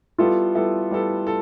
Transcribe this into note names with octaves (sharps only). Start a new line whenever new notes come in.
G3 B3 E4 F4 A4
G3 B3 E4 A4
G3 B3 E4 A4
A4